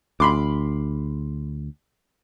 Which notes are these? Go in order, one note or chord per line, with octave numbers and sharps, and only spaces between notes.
D2 B5 C6 D6